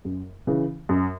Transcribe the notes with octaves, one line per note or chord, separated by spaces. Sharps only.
F#2
C#3 E3
F#2